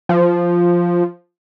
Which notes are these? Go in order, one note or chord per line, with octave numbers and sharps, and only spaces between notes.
F3